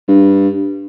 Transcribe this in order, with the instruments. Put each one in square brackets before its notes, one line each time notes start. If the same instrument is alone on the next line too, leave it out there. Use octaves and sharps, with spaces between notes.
[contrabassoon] G2